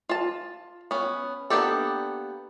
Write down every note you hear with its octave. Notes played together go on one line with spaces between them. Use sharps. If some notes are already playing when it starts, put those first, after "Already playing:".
F4 A5
B3 C#4
A#3 B3 D4 G4 A4